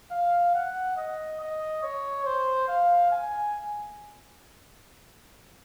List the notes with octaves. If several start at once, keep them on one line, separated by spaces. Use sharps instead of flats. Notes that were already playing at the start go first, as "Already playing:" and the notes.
F5
F#5
D#5
D#5
C#5
C5
F5
G#5